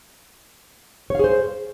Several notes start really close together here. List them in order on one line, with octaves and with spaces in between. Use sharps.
C#5 F5 G#4 C5